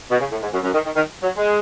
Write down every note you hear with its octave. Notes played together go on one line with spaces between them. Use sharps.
B2
C#3
A2
G#2
F#2
F#2
D#3
D#3
D#3
F#3
G#3